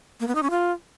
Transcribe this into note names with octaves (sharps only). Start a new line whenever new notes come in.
A#3
B3
D#4
C#4
F4